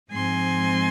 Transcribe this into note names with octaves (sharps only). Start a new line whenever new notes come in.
G#2 F3 G#3 C4 G#5 C6